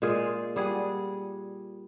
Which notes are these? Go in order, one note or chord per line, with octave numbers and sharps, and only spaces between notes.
A#2 G#3 F4 G#4
G3 G#4 F#5